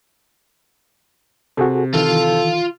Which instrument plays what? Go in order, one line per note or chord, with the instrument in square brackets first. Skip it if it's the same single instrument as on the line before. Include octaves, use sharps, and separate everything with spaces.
[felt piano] C3 [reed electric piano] F#4 G#4 A4
[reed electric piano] D#3 E3 [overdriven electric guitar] F4 F5 [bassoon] A4